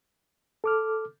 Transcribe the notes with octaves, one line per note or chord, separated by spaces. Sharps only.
A4 D6 F6